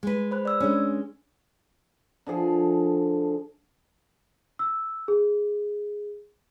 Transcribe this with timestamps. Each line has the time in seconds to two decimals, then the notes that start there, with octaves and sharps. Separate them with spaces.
0.03 G#3 B4
0.31 C5 B5 F#6
0.45 D5 E6
0.60 G#3 C#4 D4
2.26 D3 F3 G#4
4.59 E6
5.08 G#4